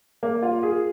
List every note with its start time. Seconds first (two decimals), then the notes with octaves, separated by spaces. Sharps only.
0.23 A#3
0.43 F4
0.63 G#4